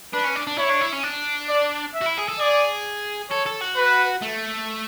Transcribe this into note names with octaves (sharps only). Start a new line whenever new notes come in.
D4 B4
C#4
D4
D4
E4 C#5
D4
E4
C#4
D4
D5
E5
F#4
E4
G#4
A4
G#4 D5
A4 C#5
A4
F#4
B4
A3